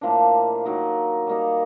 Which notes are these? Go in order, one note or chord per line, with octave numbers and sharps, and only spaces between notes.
A2 F3 A#3 D4
D#3 F#3 A#3 D#4
G3 A#3 D#4